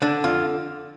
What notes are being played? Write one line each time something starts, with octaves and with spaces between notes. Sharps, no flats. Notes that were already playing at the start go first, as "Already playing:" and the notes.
D3 D4
F2 F4